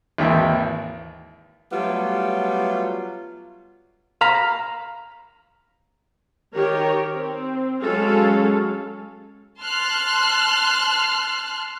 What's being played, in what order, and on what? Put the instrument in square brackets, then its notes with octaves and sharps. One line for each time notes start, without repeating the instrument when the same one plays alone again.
[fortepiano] G#1 D#2 E3 E5 G5
[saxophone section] F#3 G3 A3 B3 F4
[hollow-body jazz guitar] F5 A#5 B5
[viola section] D#3 G4 A#4 C#5
C4
F#3 G#3 C#4 A4 F5
[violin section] A5 C6 F6 F#6